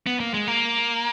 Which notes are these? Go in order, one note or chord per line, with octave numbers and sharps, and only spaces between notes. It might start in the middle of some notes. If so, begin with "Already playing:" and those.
B3
A#3
G#3
A#3